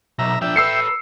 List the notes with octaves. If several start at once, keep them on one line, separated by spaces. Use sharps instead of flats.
B1 E5 A#5
F3 D4 E5 G5
A4 B4 E6 C7 C#7